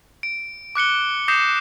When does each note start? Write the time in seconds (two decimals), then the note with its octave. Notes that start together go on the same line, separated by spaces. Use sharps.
0.23 D7
0.75 D6 F#6 C#7 G7
1.28 D6 D#6 G6 A#6 C7 E7